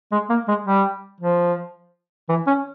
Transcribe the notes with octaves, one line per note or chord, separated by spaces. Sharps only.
G#3
A#3
G#3
G3
F3
E3
C#4